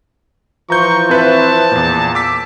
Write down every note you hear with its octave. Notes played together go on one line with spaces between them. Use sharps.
E3 F3 A#5 C#6 G6
C4 B4 E5 A5
E2 A#2
D6 E6 B6